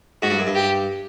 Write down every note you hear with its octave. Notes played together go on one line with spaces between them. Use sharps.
G#2 F#4
G2
F#2
G2
G4